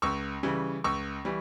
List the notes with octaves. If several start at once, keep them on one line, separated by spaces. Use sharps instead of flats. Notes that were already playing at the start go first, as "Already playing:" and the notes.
C#2 C#6 E6
C#3 E3 G3
C#2 C#6 E6
E3 G3